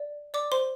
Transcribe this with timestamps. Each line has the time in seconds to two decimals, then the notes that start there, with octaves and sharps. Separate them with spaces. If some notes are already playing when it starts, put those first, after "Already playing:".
Already playing: D5
0.34 D5 D6
0.52 C5 C6